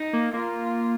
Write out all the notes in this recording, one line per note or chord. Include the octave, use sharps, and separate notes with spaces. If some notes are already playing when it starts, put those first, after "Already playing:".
Already playing: D#4
A#3
A#3 F4